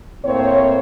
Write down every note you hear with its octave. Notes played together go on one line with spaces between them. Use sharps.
A2 A#3 C4 C5 C#5